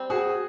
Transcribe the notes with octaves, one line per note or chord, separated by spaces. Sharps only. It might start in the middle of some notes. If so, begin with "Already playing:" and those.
Already playing: G3 C4
F#4 G#4